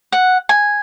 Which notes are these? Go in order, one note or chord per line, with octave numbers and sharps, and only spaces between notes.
F#5
G#5